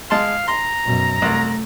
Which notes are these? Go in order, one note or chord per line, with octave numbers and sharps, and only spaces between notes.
G#3 F5 A5 C6
A#5 C6
F#2 B2
C2 A3